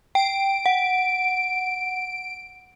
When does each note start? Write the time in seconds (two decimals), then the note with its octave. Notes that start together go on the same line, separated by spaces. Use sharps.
0.15 G5 D7
0.66 F#5